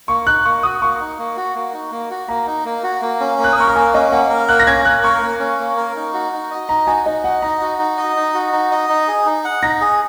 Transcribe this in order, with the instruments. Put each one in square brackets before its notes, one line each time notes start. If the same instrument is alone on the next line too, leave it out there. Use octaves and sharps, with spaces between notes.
[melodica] A#3 [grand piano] C#6
[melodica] D#4 [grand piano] F#6
[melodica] A#3 [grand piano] C#6
[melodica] F#4 [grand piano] D#6
[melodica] A#3 [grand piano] C#6
[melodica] D#4
A#3
F#4
A#3
D#4
A#3
F#4
[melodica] A#3 [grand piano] A#5
[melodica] D#4
A#3
F#4
A#3
C#4
A#3
[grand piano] F#6
D#6
[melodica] A#4 [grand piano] C#6
[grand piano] A#5
[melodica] A#3 [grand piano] G#5
[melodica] C#4 [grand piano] D#5
[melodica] A#3 [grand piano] F#5
[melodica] A#4
[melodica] A#3 [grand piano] F#6
[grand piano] A#6
[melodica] C#4 [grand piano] G#6
[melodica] A#3 [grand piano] F#6
[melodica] A#4 [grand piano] C#6
[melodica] A#3
C#4
A#3
A#4
D#4
F#4
D#4
D#5
[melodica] D#4 [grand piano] A#5
[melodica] F#4 [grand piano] G#5
[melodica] D#4 [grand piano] D#5
[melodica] D#5 [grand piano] F#5
[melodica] D#4 [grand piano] A#5
[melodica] F#4
D#4
D#5
D#4
F#4
D#4
D#5
D#4
G#4
D#4
F#5
[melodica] D#4 [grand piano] A#6
[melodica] G#4